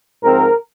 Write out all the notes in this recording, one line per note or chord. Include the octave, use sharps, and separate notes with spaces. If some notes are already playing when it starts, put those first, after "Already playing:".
G#2 F3 C4 A#4